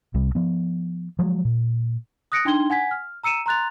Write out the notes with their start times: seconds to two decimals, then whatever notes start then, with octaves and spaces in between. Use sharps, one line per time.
0.14 C2 C3 G3
0.35 F3 B3
1.19 F3 F#3 G#3
1.45 A#2
2.32 D#6 F#6 A#6 C#7 D7
2.45 D4 D#4 G5 C6 G#6 G7
2.70 F#5 G#5 G#6 B6
2.91 F6
3.24 A#5 E6 C#7 D#7 E7
3.46 A#5 C6 F#6 A6 F7